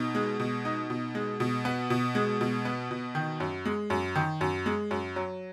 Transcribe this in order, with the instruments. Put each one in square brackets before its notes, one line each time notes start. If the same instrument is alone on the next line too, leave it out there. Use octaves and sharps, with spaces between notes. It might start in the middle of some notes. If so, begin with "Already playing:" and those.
Already playing: [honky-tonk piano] B2 D#4
G#3
B2
D#4
B2
G#3
B2
B3
B2
G#3
B2
B3
B2
D#3
F#2
G#3
F#2
D#3
F#2
G#3
F#2
F#3